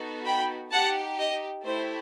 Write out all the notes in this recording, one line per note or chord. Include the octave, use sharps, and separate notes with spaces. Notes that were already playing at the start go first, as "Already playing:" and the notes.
Already playing: B3 D#4 F#4 A4
G5 B5
D#4 G4 F#5 A5
D#5
A3 E4 G4 C5